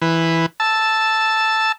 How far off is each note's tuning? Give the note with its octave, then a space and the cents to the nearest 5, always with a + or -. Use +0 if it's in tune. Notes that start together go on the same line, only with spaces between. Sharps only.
E3 +0 B4 +0
A5 +0 E6 +0